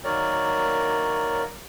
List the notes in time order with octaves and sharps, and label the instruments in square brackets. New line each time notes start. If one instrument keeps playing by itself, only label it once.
[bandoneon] D#3 F#3 A#3 A#4 C#5 D5